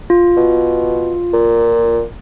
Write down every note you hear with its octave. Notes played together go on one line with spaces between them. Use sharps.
F4
B2
A#2